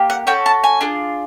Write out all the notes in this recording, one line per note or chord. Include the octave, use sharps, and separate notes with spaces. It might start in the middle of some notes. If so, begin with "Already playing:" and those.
Already playing: A#3 G4
F#5
C#4 F#4 A4 G5
A5
G#5
D4 F4 G#4